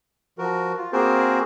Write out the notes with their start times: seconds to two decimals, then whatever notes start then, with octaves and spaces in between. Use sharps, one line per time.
0.38 F3 F#4 A#4
0.77 F4
0.93 A#3 C4 F#4 G#4 A#4 C5